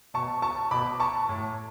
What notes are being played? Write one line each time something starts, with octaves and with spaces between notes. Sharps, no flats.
B2 A5 C#6
A5 C#6
B2 B5 D6
A5 C#6
A2